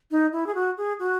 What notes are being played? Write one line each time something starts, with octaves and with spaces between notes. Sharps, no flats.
D#4
E4
G#4
F#4
G#4
F#4